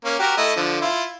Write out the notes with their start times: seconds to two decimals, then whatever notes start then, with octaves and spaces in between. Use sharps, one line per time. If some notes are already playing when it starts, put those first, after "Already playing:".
0.05 A#3 C#4
0.19 F#4 G4 A#4
0.37 A3 E4 D#5
0.56 D3 F3
0.81 E4 F4